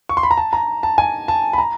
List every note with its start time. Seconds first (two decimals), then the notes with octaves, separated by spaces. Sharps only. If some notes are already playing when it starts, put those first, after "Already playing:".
0.09 C#6
0.17 C6
0.23 B5
0.31 A#5
0.37 A5
0.53 A#5
0.83 A5
0.98 G#5
1.28 A5
1.53 B5
1.58 A#5